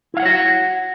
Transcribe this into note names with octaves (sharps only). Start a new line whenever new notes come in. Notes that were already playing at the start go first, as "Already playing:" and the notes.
E4 F#4 C#5 F5 F#5